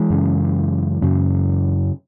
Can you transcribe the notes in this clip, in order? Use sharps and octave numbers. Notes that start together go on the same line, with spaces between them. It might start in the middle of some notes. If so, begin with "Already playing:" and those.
Already playing: E3 G#3
F#2 C#3
F#2 C#3